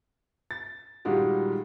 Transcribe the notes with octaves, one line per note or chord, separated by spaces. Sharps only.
A6
A#2 D#3 G3 G#3 F#4 G4